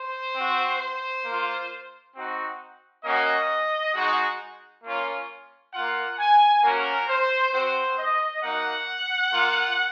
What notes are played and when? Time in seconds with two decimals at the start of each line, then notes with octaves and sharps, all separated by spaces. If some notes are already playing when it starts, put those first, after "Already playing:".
Already playing: C5
0.34 C4 F#4
0.80 C5
1.24 A#3
1.29 F4
2.14 C4 D#4 F#4
3.03 A#3 C#4 F#4 D#5
3.94 G#3 D#4 F#4
4.83 A#3 C#4 F4
5.73 A#3 F4 F#5
6.18 G#5
6.62 A#3 C#4 F#4 A#4
7.07 C5
7.52 C4 F#4 C5
7.98 D#5
8.42 A#3 D#4 F#4 F#5
9.32 A#3 F4